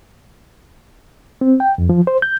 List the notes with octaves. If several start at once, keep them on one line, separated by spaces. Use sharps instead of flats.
C4
G5
F2
F3
C5
G6